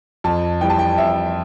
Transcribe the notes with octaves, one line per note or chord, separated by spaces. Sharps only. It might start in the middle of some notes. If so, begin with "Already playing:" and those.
F2 A5
E3 G3 G5
A5
G5
F2 E5